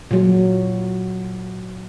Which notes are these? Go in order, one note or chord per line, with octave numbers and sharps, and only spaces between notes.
A#2 F#3